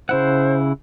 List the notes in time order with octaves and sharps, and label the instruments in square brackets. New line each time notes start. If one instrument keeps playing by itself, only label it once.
[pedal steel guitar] C#3 E4 F#5 [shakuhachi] C5